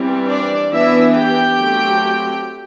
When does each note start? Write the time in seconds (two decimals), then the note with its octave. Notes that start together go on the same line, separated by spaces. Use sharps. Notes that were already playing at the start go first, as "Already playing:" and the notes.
Already playing: E3 G3 C4
0.28 D4 D5
0.71 E3 B3 D4 E4 E5
1.15 G4 G5
1.59 F#3 A3 C4